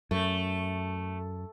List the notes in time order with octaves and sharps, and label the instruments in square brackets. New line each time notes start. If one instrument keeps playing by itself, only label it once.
[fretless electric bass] F#2 [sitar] A3